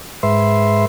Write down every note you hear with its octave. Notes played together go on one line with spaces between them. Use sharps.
G#2 B4 E5 C6